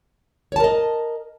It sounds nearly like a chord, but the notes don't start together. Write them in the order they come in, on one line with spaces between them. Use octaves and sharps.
C#5 A5 A#4 D#5